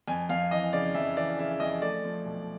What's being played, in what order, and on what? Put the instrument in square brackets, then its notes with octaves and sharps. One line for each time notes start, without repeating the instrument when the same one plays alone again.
[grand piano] F2 G#5
F2 F5
E3 D#5
C#3 D5
F2 E5
E3 D5
C#3 E5
F2 D#5
A3 D5
F3
B1